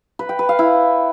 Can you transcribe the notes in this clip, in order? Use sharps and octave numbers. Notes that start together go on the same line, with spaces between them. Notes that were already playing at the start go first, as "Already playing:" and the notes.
B4
G5
B4
F5
E4